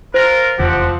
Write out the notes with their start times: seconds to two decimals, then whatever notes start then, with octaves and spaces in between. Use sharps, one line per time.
0.14 F4 A#4 C5
0.59 F1 E2 C#3 F3 C4 G4 F#5